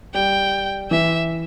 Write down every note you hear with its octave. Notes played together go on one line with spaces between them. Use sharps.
G3 G5
E3 E5